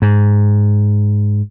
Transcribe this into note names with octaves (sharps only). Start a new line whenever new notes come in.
G#2